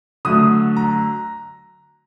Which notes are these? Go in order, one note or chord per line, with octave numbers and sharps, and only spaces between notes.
D3 F#3 A3 D#6
A#5